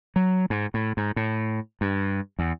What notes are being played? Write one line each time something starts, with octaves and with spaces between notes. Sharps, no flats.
F#3
G#2
A2
G#2
A2
G2
E2